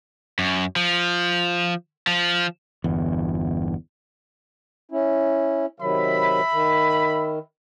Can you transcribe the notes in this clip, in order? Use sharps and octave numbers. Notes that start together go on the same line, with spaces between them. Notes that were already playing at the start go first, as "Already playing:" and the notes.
F#2
F3
F3
G1 E2
C#4 E4
C3 D#3 F#3 E5 B5
D#3